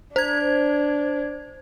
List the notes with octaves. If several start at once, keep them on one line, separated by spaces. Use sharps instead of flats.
D4 C5 G#6